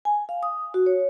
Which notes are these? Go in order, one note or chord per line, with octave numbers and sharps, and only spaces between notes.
G#5
F5
D#6
F#4
C#5